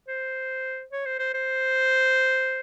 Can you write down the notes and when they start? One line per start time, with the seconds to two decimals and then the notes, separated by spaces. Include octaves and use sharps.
0.08 C5
0.92 C#5
1.06 C5
1.19 C5
1.34 C5